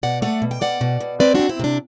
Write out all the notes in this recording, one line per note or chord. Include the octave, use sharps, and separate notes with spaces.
B2 D5 F#5
A3 D5 F#5
B2
G5
B2 D5 F#5
B2
B2
C4 B4 D5
C4 D4 F#4
C4 E4
C3 D4